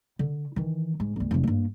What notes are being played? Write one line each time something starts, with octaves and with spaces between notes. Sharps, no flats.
D3
D#3 E3
G#2
G1 D2
F1 F3
G2 A#3